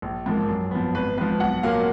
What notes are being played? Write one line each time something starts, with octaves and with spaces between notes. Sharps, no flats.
A#1
G#2 F3 A#3
F#2
F3 B3
G#1 B4
G#2 F3 B4
B1 F#5
A#2 F#3 A#3 F5